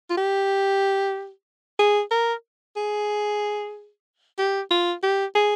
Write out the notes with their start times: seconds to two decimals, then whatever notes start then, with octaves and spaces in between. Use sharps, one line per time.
0.10 F4
0.17 G4
1.79 G#4
2.11 A#4
2.76 G#4
4.38 G4
4.71 F4
5.03 G4
5.35 G#4